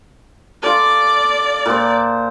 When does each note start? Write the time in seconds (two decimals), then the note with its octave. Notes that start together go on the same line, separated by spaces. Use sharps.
0.63 F4 A4 D5
1.66 A#2 C5